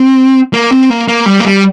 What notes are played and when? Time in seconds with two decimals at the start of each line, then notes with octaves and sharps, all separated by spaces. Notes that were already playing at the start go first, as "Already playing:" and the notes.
Already playing: C4
0.53 A#3
0.71 C4
0.90 A#3
1.08 A#3
1.26 G3
1.40 A#3
1.45 G3